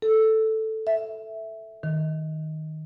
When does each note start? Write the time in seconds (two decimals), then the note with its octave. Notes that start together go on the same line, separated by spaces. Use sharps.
0.02 A4
0.87 E5
1.83 D#3